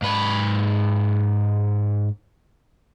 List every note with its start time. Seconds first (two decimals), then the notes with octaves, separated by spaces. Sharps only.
0.02 G#2 B4